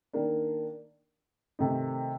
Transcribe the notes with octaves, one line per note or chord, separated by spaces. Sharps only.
D#3 A#3 D4
C3 D#3 A3 D#4